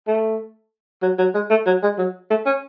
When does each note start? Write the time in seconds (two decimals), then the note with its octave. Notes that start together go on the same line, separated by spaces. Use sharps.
0.07 A3
1.02 F#3
1.18 F#3
1.35 G#3
1.50 A3
1.66 F#3
1.83 G#3
1.98 F#3
2.30 A3
2.46 C#4